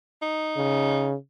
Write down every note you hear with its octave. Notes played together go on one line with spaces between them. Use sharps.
D#4
C#3